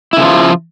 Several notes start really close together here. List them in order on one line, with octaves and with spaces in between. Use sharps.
E4 C#3 F3 F4